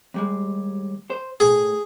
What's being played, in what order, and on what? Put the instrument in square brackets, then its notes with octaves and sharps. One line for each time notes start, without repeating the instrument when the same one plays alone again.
[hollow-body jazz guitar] D#2 G3 G#3
C5
[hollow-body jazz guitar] A2 [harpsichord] G#4